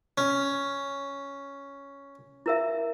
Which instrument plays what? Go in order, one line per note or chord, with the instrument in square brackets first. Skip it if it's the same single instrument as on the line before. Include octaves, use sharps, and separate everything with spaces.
[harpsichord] C#4
[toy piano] E4 A#4 E5